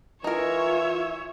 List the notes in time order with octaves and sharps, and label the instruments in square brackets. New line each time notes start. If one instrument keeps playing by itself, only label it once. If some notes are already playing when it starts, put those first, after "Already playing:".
[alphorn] E3 [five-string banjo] D#4 A#4 [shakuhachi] F4 [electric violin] C#5 E5